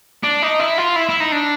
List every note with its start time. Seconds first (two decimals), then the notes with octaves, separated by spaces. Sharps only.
0.23 D4
0.42 D#4
0.59 E4
0.78 F4
0.96 E4
1.09 E4
1.20 D#4
1.32 D4